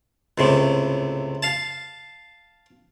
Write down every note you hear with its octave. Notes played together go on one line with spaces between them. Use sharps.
C#2 A2 C3
F5 A5